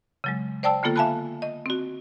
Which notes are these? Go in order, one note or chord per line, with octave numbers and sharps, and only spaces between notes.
C#3 F#3 G#3
C5 D5 G5 A5 E6
D3 A#3 B3 F4 A4
E5 F5 G#5 A5 B5 F#6
D#5
C4 F#4